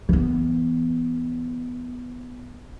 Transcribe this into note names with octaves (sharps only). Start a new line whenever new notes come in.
E3 B3